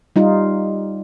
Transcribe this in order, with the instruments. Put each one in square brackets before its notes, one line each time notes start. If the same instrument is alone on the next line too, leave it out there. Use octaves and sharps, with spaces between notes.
[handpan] G3 D#4 F4